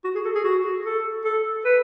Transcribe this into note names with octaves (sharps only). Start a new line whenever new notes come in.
F#4
G#4
A4
G#4
F#4
A4
A4
B4